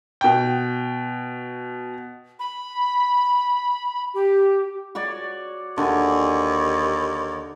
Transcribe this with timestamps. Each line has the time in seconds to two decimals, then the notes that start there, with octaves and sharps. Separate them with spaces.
0.21 B2 G5
2.39 B5
4.14 G4
4.95 F#4 C#5 D5
5.78 D#2 D3 G#5